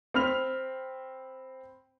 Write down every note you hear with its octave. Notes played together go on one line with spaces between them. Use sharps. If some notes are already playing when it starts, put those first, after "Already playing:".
C4 B5 F6 F7